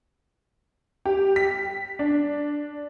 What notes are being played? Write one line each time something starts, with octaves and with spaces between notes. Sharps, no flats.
G4
B6
D4